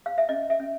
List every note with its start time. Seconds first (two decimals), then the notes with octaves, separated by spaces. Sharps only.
0.06 F5
0.18 E5
0.29 C#4 D#5
0.50 E5
0.60 C#4